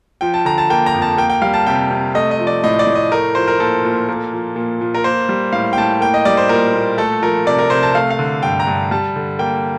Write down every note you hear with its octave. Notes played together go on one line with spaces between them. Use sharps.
F3 G5
A5
D3 A#5
A5
A#3 G5
A#5
F2
A5
A#3 G5
G5
G3 F5
A5
C3 G5
C3
A3 D#5
D#5
F3
D5
A2 D#5
D5
A2
D#5
A3 A#4
F3 C5
A#4
A#2 A4
A#2
A#3
F3
A#2
A#2
A#4
A#3 C5
G3
A2 F5
G5
A2 A5
A#3 G5
D#5
G3 D5
C5
A#2 A#4
A#2
A3 A4
F3 A#4
C3 D5
A#4
C3 C5
A5
A3 F5
F5
D3
G2 G5
A#5
G2
G3 A5
D3
A#3 G5